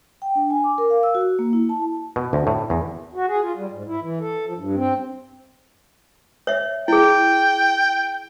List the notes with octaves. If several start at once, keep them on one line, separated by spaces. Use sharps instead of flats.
G5
D4
G#5
D6
A#4
F5
E6
F#4
A#3
E4
A5
B2
D2
A2
E2
F#4
G#4
F4
G3
G#2
E4
E3
A4
F3
G2
C4
C#5 E5
E4 G#4 G5